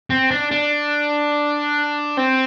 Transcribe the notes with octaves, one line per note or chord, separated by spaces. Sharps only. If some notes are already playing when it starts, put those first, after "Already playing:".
C4
D4
D4
C4